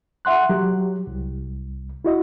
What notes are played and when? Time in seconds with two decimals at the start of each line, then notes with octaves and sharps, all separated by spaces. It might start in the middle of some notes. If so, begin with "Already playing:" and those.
0.25 E5 F#5 C6 F#6
0.49 F#3 G4
1.07 C2
2.05 E4 F#4 D#5